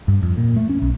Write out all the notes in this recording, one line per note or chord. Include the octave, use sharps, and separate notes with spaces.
G2
F2
A#2
A3
C#4
B1